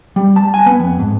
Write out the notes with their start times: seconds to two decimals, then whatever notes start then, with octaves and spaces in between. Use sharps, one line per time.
0.16 G3
0.36 A5
0.54 G#5
0.66 B3
0.80 F2
1.00 G#2